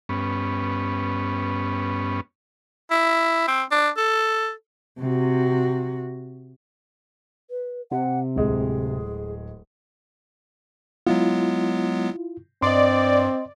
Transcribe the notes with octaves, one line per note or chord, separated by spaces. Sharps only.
G2 B3 C#4
E4
C4
D4
A4
C3 F#4
B4
C3 F#5
D1 G#3 G#4
F#3 G#3 B3 E4 F4
G2 C4 D5 D#5 C6